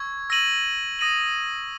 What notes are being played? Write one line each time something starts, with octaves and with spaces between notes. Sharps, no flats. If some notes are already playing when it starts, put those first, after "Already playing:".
Already playing: C#6 E6 G#6
E6 A#6 D#7 F#7
D#6 A#6 D#7 F#7